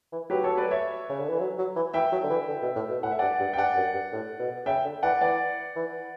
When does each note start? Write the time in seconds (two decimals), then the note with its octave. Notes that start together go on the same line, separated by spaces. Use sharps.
0.12 E3
0.30 F#3 G4 B4
0.44 A4 C#5
0.58 B4 D5
0.71 C#5 E5
1.09 C#3
1.19 D3
1.29 E3
1.40 F#3
1.58 F#3
1.76 E3
1.94 E3 E5 G5
2.12 F#3
2.23 D3
2.30 E3
2.48 D3
2.62 B2
2.76 A2
2.90 B2
3.03 A2 F#5
3.11 E5
3.19 G2 D5 F#5
3.40 G2
3.53 G5
3.57 G2 D5 F#5
3.76 F#2
3.94 G2
4.12 A2
4.39 B2
4.66 C#3 E5 G5
4.85 D3
5.02 E3 D5 F#5
5.21 E3 D5 F#5
5.76 E3